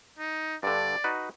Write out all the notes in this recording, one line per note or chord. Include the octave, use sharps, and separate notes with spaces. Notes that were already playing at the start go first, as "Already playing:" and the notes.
D#4
G2 D3 D5
D#4 F#4 B4